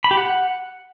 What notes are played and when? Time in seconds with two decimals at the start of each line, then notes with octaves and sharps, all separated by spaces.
0.04 B5
0.11 G4
0.17 F#5